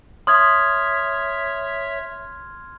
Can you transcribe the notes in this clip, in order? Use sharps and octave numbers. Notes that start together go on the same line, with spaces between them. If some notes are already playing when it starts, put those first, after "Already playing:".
C#5 E5 C6 D#6 F6 G#6 B6